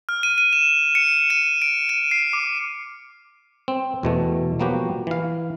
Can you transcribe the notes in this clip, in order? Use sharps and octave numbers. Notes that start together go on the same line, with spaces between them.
F6
D#7
D#7
E7
C#7
D#7
D7
D#7
C7
D6
C4
E2 B2 A3
F3 F#3 A#3 B3 F#4 G4
E3 F5